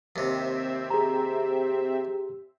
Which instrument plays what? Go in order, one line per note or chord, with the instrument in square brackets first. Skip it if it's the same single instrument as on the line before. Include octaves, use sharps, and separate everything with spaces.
[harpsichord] D#2 C3 [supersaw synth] C4 E5
[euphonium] G4 [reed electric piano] G#4 A#5